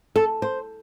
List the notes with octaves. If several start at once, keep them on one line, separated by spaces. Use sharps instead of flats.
A4
C5